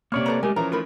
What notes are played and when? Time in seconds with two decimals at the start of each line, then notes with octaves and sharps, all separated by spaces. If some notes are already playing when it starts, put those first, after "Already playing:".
0.12 C3 A#3 C#5 D5 C#6 F6
0.26 A4 B4 A#5
0.43 G#3 A3 G4 A#4 D#5 G#5
0.56 E3 F3 C#4 A#4 A#5
0.72 A3 D#4 F4 A#4 B5